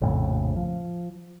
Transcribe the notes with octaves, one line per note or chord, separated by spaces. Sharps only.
A#1 F2 A2 C#3
F3